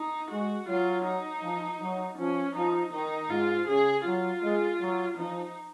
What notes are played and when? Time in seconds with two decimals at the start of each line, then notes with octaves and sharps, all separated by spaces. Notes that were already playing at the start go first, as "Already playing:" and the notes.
Already playing: D#4
0.30 G#3 F#4
0.68 F#3 F4
1.06 D#4
1.43 F3
1.81 F#3
2.18 F3 C#4
2.55 F3 D#4
2.93 D#3 D#4
3.30 G#2 F4
3.67 C#3 G#4
4.05 F#3 F4
4.42 G#3
4.80 F#3
5.17 F3 D#4